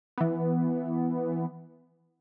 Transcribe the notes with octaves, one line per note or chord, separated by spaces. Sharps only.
E3 B3